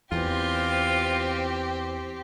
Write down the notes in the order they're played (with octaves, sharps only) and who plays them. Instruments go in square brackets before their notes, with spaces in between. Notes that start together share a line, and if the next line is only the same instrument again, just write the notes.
[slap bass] E2 [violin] C4 G4 [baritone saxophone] F4